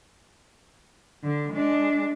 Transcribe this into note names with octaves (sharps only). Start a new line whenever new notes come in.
D3
G#3 D4